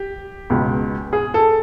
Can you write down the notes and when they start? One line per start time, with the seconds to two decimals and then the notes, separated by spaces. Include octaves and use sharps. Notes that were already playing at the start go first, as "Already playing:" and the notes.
Already playing: G4
0.50 C#2 B2 G#3
1.13 G#4
1.34 A4